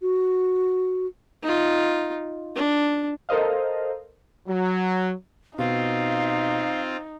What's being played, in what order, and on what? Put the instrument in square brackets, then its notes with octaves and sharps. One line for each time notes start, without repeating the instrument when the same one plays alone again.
[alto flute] F#4
[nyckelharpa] D#4 F4
D4
[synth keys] A4 A#4 C5 D#5 F5
[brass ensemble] F#3
[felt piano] B2 [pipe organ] C4 F4 [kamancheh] D#4 [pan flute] F5